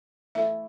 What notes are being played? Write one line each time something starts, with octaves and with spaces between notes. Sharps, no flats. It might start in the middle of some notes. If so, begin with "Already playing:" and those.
E3 A3 E4 A4 E5